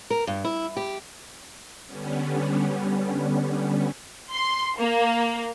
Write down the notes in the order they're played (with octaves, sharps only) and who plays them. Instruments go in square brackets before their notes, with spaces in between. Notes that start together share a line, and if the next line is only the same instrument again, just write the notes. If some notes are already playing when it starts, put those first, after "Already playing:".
[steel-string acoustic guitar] A#4
G2
E4
G4
[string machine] D3 G3 B3 C#4
[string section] C6
A#3